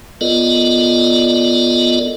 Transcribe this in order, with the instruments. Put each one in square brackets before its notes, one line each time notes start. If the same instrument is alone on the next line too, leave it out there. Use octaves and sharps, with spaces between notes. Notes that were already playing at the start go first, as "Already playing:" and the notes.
[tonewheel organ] B3 F4 A4 A#4 D5 D#5